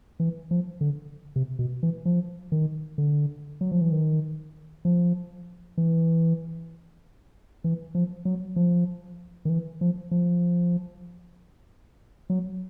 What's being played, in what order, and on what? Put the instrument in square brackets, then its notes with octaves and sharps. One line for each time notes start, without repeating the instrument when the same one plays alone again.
[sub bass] E3
F3
D3
C3
B2
E3
F3
D#3
D3
F#3
F3
E3
D#3
F3
E3
E3
F3
F#3
F3
D#3
E3
F3
F3
F#3